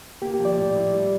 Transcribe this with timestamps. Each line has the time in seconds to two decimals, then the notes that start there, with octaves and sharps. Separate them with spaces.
0.22 A#3 G4
0.34 G4
0.40 F3
0.45 D5
0.57 A2
0.75 E4
0.93 G3